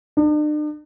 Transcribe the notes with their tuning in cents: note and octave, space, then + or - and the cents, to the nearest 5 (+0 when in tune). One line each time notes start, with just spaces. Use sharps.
D4 +45